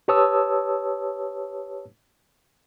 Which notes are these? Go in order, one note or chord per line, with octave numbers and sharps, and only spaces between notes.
G4 B4 C#5 A5 D#6 E6